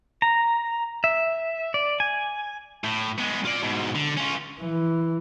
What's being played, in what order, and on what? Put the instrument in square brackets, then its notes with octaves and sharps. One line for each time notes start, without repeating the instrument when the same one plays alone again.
[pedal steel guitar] A#5
E5
D5
G#5
[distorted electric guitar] A2
G#3 B3
F4 D5
G#2 B2
D3
C#4 F4
[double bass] E3